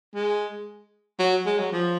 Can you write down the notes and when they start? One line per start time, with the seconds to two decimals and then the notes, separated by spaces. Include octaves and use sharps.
0.15 G#3
1.19 F#3
1.46 G#3
1.59 F#3
1.72 F3